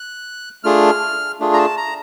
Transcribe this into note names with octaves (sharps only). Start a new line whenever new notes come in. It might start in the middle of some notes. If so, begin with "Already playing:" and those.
Already playing: F#6
A3 D4 F4 G#4 F6
A3 D4 F4 G#4
A#5
A5
A#5